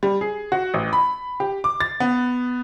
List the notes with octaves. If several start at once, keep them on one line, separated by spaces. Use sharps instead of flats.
G3
G#4
F#4
A1
B5
G4
D6
A6
B3